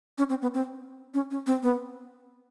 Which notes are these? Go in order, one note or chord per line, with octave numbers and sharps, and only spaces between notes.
C#4
C4
B3
C4
C#4
C#4
C4
B3